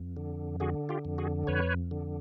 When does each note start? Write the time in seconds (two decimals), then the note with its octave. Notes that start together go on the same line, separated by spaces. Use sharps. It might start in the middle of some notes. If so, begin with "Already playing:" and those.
Already playing: F2
0.17 D3
0.60 D3 F#4 G#4
0.89 F4 G4
1.05 F2
1.18 F#4 G#4
1.47 F2 B4 C#5
1.91 D3